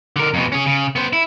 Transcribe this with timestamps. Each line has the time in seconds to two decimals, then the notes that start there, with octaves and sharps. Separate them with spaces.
0.16 D3 A#4
0.34 F2 B2
0.52 C#4 G#4
0.66 C#3
0.96 B3 C5
1.13 E4